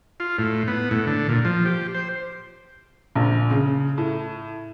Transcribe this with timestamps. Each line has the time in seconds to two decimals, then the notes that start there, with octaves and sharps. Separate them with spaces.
0.20 F4
0.39 A2
0.68 B3
0.91 A2
1.07 D3
1.29 A#2
1.45 F3
1.65 G4
1.95 C5
3.15 A#1
3.50 C#3
3.98 A2